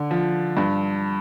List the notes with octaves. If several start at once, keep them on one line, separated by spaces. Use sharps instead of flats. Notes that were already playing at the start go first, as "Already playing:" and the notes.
Already playing: D3
F3
G2